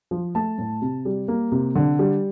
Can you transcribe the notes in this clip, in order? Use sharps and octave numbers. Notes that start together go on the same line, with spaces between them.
F3
A3 A5
A2
C3
G3
A#3
C3
D3
G3